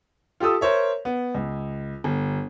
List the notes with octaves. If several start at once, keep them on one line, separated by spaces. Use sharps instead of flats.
F4 G4 A4 D#6 E6
A#4 C5 C#5 E5
B3
C#2
G1